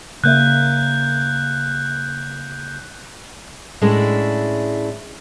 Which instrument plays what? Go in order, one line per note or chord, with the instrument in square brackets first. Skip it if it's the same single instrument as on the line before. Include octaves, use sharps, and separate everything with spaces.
[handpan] C#3 A#3 E5 [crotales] F#6 G6
[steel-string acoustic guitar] A2 G#3 C#4 D4 E4